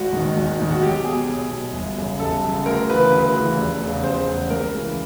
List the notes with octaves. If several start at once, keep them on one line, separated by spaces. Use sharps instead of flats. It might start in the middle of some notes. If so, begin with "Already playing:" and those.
Already playing: G#1 F#4
G#2 D#3
G#1
G#2 D#3
F#4
B1 G4
B2 G#4
B1
B2
G1
F#2 C#3
G1 A4
F#2 C#3
D2 A#4
C#3 E3 B4
D2 B4
C#3 E3
F1
E2 C#3
F1 C5
E2 C#3
C#2 A#4
C#3 E3